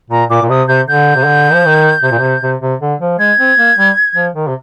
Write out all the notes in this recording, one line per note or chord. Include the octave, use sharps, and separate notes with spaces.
A#2 A#5
A#2 D6
A#2
C3 D#6
C3 G6
D3 G6
C3
D3
F3
D#3
C3
A#2
C3
C3
C3
D3
F3
G#3 G#6
C4
A#3
G3
F3
D#3
C3